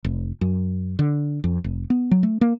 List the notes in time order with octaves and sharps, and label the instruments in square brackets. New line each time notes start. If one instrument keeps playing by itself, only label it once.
[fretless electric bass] F1
F#2
D3
F2
F1
B3
F#3
A3
A#3